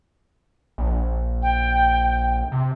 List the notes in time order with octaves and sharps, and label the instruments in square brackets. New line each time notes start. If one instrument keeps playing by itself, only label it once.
[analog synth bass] A#1
[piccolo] G5
[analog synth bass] C3